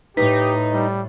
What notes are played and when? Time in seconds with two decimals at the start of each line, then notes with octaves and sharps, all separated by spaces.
0.17 A2 D#4 G4 B4 B6
0.72 G3